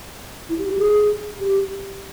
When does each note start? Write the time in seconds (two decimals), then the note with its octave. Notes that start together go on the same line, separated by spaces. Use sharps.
0.49 E4
0.59 G4
0.69 G4
0.79 G#4
1.40 G4